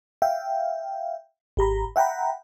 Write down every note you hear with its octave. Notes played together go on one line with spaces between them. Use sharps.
E5 F5 G5
G#1 G4 A#5 B5
E5 F#5 G5 A#5 B5